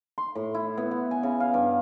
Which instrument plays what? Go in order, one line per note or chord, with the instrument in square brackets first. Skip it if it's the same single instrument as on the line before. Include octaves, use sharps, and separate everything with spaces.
[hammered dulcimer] C6
A2
E4
B3
F#5
G#5
C#3
F5
G2